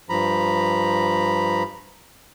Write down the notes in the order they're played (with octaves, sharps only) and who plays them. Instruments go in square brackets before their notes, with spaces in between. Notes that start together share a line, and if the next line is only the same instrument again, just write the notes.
[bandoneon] G2 F3 A#5 B5